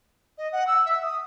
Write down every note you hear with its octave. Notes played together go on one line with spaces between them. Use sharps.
D#5
F#5
E6
E5
D#6